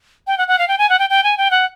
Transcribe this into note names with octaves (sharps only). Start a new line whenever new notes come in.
G5
F#5
F#5
F5
G5
G#5
F#5
G5
G5
G#5
G5
F#5